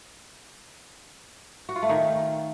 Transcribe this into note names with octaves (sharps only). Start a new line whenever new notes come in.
F#4
F4
A3
D#3